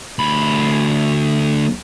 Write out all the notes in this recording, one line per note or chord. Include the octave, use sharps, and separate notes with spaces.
D2 B5